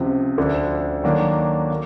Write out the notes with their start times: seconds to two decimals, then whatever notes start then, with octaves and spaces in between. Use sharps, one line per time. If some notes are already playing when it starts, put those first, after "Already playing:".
Already playing: C#2 C3 F3
0.38 D2 D3 F3
1.04 D#3 F#3 A#3 D4
1.70 A#3